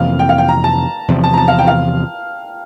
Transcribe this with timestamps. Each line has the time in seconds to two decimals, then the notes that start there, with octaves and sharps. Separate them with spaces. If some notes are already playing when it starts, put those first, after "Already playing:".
Already playing: F2 C3 E3 A#3 F5
0.19 G5
0.29 F5
0.38 G5
0.49 A#5
0.64 A5
1.08 E2 C3 F3
1.24 A5
1.34 A#5
1.38 A5
1.48 F5
1.59 G5
1.67 F5